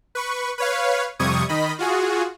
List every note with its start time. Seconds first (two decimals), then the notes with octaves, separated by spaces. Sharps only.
0.15 B4 C#6
0.58 B4 C#5 F5
1.19 F2 C3 G3 C#6 D#6 G#6
1.49 D#3 D#5 B5
1.79 F4 F#4 G#4